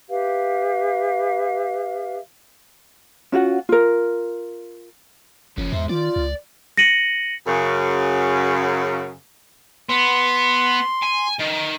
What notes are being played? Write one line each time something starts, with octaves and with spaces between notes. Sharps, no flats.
G4 B4 E5 F5
C#4 F4 F#4 F#5
F4 A#4
F#1 F3 C#4
E2 G#2 C5 E5
D#3 F4 D5
C#2
A#6 C#7 D#7 F#7
F#2 C#3
B3 C6
G#5
D#3